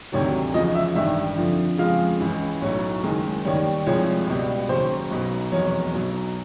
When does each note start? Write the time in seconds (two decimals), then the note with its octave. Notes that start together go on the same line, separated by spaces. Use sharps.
0.12 D2 C3 D#3 F#3 C#5
0.54 E2 C#3 F3 D#5
0.75 E5
0.95 A1 G2 D#3 E5
1.38 F2 D3 F3
1.78 F2 C#3 F3 G#3 F5
2.20 C#2 C#3 E3
2.62 B1 A2 F#3 C#5
3.03 F#1 F#2 D#3 G#3
3.44 D#2 D#3 G3 C#5
3.86 C2 C3 F3 G#3 C#5
4.27 C#2 B2 G3
4.69 D#2 C#3 F#3 C5
5.11 B1 B2 F#3
5.52 F1 E2 B2 F#3 C#5
5.94 B1 B2 F#3